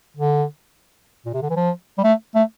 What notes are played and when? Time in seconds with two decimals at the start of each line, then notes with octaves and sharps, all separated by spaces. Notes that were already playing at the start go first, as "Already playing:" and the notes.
0.16 D3
1.26 A#2
1.33 C3
1.42 D3
1.50 E3
1.56 F3
1.98 G3
2.04 A3
2.35 A3